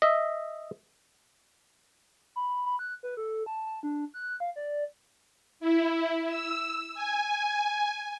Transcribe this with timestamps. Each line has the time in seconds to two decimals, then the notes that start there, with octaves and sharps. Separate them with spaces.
0.02 D#5 E5
2.36 B5
2.66 B5
2.79 F#6
3.03 B4
3.17 A4
3.46 A5
3.66 A5
3.83 D4
4.14 F#6
4.40 F5
4.56 D5
5.60 E4
6.28 E6
6.94 G#5